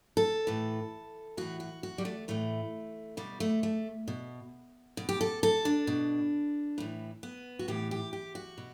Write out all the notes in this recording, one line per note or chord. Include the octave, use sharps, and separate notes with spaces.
A4
A2 E3
A2 E3 F#4
F#4
F#4
G3
A3
A2 E3 A3
B2 G3
A3
A3
B2
B2
G4
A4
A4
D4
B2
A2 E3
B3
F#4
A2 E3 G4
G4
G4
F#4
B2